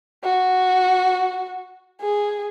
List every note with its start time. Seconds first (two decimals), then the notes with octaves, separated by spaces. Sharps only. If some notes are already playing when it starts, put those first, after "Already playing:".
0.24 F#4
2.01 G#4